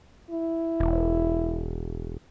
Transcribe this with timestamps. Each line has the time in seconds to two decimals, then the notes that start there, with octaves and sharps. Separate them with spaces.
0.31 E4
0.80 E1